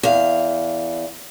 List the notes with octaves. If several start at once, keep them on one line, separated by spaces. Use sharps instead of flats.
E2 F5